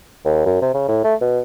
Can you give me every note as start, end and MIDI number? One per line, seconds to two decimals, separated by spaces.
0.25 0.41 39
0.46 0.60 42
0.62 0.73 48
0.74 0.86 49
0.88 1.01 45
1.04 1.14 57
1.21 1.41 47